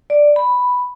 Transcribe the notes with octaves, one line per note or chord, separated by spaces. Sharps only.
D5
B5